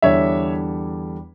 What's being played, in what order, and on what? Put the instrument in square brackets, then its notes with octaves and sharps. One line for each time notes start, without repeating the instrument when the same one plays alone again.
[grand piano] E2 D3 G3 D4 [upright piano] C#5 E5